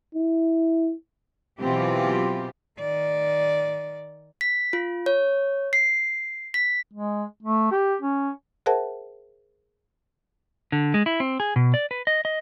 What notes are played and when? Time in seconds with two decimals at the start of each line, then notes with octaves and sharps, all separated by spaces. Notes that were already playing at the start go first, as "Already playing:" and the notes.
0.15 E4
1.60 B2 E3 F#3 C4 F4 G4
2.79 D#3 D5
4.41 B6
4.73 F4
5.06 C#5
5.73 C7
6.54 B6
6.93 G#3
7.43 A3
7.71 G4
8.02 C#4
8.66 G#4 A#4 C5 E5 F#5 A5
10.72 D3
10.94 G#3
11.06 E4
11.20 C4
11.40 G#4
11.56 B2
11.74 D5
11.91 B4
12.07 D#5
12.25 D#5